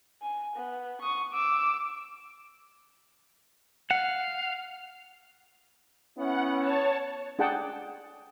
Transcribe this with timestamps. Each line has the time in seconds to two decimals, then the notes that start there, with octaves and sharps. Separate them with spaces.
0.22 G#5
0.56 B3
1.01 C#6 D#6
1.33 D6 E6
3.91 F5 F#5
6.18 B3 C#4 E4 F#5
6.59 C#5 A5
7.39 D4 G#4 F#5 G5 A5